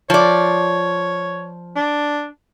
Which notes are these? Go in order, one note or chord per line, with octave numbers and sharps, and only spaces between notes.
F3 C#5 D5
D4